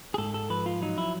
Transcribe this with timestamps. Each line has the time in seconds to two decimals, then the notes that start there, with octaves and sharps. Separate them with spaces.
0.14 G#4
0.18 G#2 A4
0.34 A4
0.50 F3 B4
0.66 F4
0.82 F#3 D#4
0.98 E4